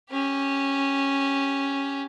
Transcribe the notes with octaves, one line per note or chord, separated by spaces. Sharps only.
C#4 G4